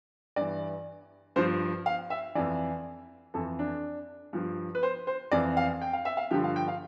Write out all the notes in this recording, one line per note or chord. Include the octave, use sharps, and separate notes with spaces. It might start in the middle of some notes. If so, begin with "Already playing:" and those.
G2 E3 D5
G2 F3 C5
F5
E5
F2 E3 D5
F2 E3 A4
D4
G2 F3
B4
C5
C5
F2 E3 D5
F5
G5
F5
E5
F5
G2 D3 F3 G4
F5
G5
F5